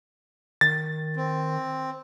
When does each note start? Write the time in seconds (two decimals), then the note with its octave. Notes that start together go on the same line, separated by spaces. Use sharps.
0.61 D#3 A6
1.16 C4